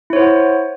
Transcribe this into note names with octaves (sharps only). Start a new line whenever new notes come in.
E4 C5 C#5 F#5